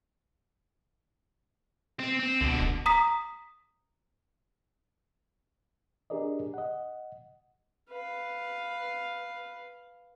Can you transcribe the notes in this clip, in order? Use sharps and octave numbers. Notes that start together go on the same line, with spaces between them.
C4
C4
C#2 B2 D3
D1
A#5 D#6 B6
D4 G4 G#4 A#4 D5 D#5
D#5 F#5
B4 F5